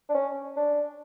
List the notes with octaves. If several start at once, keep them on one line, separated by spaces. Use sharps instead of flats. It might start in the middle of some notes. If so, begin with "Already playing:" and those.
D4
C#4
D4